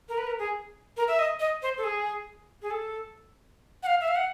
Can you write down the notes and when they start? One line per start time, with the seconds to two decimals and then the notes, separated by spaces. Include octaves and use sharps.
0.09 A#4
0.18 B4
0.27 A#4
0.39 G#4
0.97 A#4
1.08 E5
1.19 D#5
1.40 D#5
1.62 C5
1.78 A4
1.84 G#4
2.62 G#4
2.71 A4
3.83 F#5
3.87 F5
4.01 E5
4.08 F5
4.16 F#5